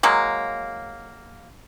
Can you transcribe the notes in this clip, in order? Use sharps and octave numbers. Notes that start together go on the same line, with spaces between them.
F#3 G#3 A#3